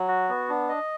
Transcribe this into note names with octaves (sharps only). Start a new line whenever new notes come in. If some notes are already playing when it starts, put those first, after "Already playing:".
Already playing: F#3
F#4
B3
D4
D#5